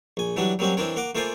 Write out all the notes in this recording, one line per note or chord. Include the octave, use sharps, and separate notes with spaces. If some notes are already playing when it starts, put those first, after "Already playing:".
A#1 G#5
E3 F#3 G3 D4 F#4
F#3 G3 A#3 C4 C#4 F#4
E3 C4 D4 A#4 C#5
A#3 F#5 A#5 D6
A3 A#3 F4 C5 D5 G#5